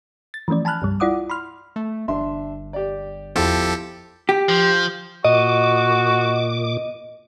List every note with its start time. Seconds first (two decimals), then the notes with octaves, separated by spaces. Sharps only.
0.34 A6
0.48 E3 F3 A3 C#4 D5
0.65 G#5 A5 B5 F6 F#6
0.82 C2 G2 G3
1.00 E4 F4 D5 F#5 D6 D#6
1.30 B5 C6 F6
1.76 A3
2.08 G1 D4 E5 C6
2.73 G4 D5
3.36 E2 F3 E4 G4 A4
4.29 G4
4.49 F3
5.25 A#2 F#4 D#5 D6